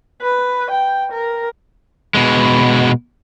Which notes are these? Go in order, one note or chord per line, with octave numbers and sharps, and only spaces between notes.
B4
G5
A#4
B2 G#3